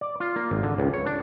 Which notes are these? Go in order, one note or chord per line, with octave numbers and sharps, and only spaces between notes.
D5
F4
A#3
G#1
D3
C#2
C#5
D4